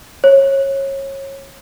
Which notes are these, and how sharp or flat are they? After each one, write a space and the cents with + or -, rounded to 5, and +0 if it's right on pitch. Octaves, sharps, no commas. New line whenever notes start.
C#5 -25